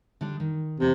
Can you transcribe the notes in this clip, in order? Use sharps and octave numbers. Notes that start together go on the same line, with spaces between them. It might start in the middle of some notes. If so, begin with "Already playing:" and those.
D3 G3 D4
D#3
E2 C3 A#5